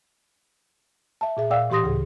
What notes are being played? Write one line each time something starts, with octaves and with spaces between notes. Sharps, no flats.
E5 A5
A#2 G#4 E5
A#2 D5 F5 G5 E6
A2 E3 G4 C6 D#6 A#6
D2 C#3 G#4